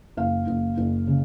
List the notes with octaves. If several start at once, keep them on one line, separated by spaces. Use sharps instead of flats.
F#1 F5
F#1
F#1
C#3